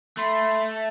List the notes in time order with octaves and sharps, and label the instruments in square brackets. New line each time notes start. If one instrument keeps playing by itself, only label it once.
[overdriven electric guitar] A3 [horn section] B5 C6